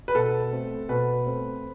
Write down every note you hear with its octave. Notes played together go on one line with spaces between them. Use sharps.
B4
B2 A4
A3 C4
B2 B4
A3 C4